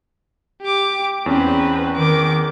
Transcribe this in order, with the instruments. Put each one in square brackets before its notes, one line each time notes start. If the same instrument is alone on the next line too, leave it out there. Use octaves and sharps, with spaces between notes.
[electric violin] G4 D6
[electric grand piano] E2 C#4 [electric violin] C4 B4
[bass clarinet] D#3 [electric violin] D6